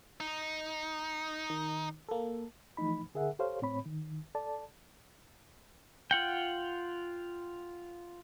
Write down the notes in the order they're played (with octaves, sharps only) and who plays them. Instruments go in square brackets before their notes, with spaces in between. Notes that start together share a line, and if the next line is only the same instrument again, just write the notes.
[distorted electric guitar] D#4
[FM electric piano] D#3
A#3 A4
[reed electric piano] E3 F3 A3 D#4 B5
D3 G#4 A#4 E5 F#5
G4 A4 C5 C#5 F5
A2 C4 C#5 B5
D#3
A4 D5 A5
[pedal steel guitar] F4 F#5 G5